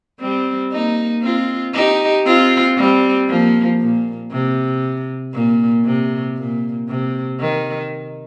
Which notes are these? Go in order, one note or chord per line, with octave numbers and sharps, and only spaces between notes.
G3 C4
A#3 D#4
C4 F4
D#4 G4
C4 F4
G3 C4
F3 A#3
A#2
C3
A#2
C3
A#2
C3
D#3